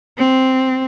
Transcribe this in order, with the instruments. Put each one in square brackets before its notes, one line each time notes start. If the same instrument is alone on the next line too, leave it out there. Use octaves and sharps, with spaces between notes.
[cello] C4